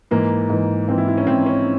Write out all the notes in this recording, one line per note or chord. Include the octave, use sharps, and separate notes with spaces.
G#2 E3 A#3
G#2 E3
G#2 E3 C4
E4
E4
C#4
G#2 E3 C4
C#4